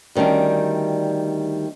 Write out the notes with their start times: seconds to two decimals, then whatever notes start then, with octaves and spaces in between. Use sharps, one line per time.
0.15 D2 D#3 G3 C#4 D4